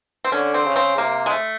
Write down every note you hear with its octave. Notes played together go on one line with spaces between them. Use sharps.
C4
D3 C#4
C4
C#3
C4
C3 A#3
G#3
A3